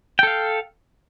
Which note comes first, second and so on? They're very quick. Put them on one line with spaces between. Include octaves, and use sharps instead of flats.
G5 A4 F5